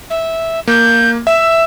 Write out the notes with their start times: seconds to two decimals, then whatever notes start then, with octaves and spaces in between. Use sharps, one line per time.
0.10 E5
0.67 A#3 G6
1.27 E5 E6